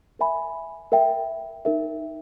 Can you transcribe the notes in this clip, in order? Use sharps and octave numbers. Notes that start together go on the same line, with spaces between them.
A#4 E5 G#5 B5
A#4 E5 G5
D#4 A#4 E5